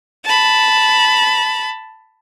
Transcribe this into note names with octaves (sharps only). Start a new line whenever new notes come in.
A5 B5